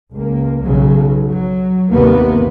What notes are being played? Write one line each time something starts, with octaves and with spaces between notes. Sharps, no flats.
C#2 A#3
B1 C#3 F#3
F#3
G1 D#2 C3 A#3 B3